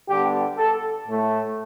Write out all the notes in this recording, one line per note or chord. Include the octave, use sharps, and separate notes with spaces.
D3 G3 B3 G4
A4
A2 A3